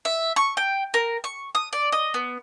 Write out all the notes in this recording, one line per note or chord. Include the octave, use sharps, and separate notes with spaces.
E5
C#6
G5
A#4
C#6
D#6
D5
D#5
B3